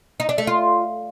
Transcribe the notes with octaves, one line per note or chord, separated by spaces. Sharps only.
D#4
D4
A3
F4